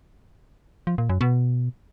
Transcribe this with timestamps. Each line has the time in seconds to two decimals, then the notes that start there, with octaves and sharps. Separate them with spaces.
0.87 F3
0.98 A#2
1.09 F#2
1.21 B2